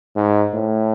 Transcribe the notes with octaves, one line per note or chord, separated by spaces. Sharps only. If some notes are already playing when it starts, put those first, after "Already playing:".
G#2
A2